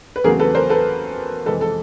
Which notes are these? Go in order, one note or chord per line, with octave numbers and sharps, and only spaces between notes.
B4
E2 C#3 F#3 A3 C4 G#4 A#4
A4 B4
A#4 C5
A4 B4
F2 C3 E3 G#3 C4 A4 B4
A4